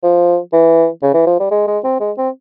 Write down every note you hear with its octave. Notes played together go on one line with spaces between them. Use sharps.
F3
E3
C#3
E3
F3
G3
G#3
G#3
C4
G#3
C4